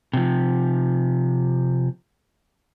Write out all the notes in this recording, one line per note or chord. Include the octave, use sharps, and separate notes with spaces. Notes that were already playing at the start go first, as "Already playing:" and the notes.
C3 F3